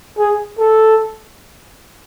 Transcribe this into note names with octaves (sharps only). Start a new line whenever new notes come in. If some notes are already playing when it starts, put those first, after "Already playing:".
G#4
A4